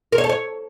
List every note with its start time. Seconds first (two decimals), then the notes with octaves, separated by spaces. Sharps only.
0.12 A#4
0.18 C#5
0.24 A4
0.29 C#5